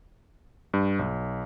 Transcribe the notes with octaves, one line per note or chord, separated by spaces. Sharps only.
G2
B1